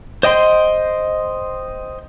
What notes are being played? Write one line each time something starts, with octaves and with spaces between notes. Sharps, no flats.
C5 D#5 G5 C6